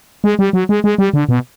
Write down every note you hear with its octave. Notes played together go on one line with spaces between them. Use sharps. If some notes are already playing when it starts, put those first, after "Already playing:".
G#3
G3
F#3
G#3
G#3
G3
D3
B2